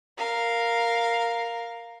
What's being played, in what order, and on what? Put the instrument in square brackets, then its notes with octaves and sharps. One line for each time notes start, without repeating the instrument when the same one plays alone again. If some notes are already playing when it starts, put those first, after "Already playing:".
[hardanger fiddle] A#4 F5